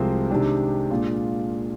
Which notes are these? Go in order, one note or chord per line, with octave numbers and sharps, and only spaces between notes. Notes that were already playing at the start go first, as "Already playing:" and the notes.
Already playing: C2 C3 F3 G#3 C4
C3 D#3 G#3 D4 G4
A#2 G#3 D4 F4